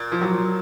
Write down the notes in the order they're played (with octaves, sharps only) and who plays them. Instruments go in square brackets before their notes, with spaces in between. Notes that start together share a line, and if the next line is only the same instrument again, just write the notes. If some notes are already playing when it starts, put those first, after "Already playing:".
Already playing: [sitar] A#2
[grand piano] F3
F#3